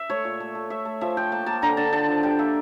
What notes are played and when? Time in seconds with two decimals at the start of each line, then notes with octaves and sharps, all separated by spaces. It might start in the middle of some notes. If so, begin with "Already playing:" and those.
Already playing: E5
0.10 A3 C#5
0.25 A#2
0.40 A3
0.55 A3
0.70 A3 E5
0.85 A3
1.01 F3 E5
1.17 F3 G5
1.32 A#3 A5
1.46 A#3 A5
1.62 D3 A#5
1.77 D3 A5
1.92 D3 A5
2.09 F3
2.23 G3 G5
2.39 A#3 E5